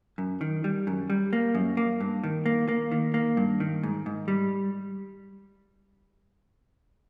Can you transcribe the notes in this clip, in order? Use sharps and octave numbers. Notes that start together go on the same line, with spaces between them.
F#2
D#3
G3
F#2
G3
A#3
F#2
A#3
G2
D#3
A#3
A#3
D#3
A#3
G2
D#3
G#2
G#2
G3